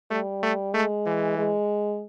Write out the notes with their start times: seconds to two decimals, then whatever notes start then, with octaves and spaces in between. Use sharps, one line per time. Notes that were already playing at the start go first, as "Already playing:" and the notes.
0.10 G3 A3
0.43 A3
0.74 G#3 A3
1.06 E3
1.38 G#3